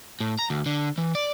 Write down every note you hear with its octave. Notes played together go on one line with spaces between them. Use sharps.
A2
A#5
D2
D3
E3
D5